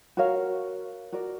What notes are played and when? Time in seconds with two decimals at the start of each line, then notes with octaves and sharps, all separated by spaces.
0.17 F#4 A#4 C#5 F5
1.12 F#4 A#4 D5